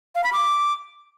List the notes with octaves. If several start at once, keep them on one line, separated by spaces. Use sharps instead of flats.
F5
B5
D6